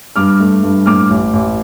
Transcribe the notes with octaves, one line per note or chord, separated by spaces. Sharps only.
G2 D6 F6
A3
G2
A2 D6 F6
A1
A1